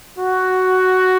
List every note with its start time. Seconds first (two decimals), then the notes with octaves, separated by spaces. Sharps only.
0.18 F#4